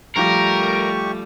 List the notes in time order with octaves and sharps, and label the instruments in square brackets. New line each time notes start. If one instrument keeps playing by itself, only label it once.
[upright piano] A#1 F4 A#6 [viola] G3 A3 [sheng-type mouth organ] G4 C#6 [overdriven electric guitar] A#4